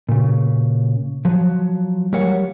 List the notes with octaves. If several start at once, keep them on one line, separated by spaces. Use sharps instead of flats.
A#2 C#3
F3 F#3
F#3 G3 A#4 C#5 F5 F#5